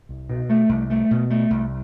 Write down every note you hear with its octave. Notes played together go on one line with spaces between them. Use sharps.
C2
B2
A3
C2
A3
B2
A3
C2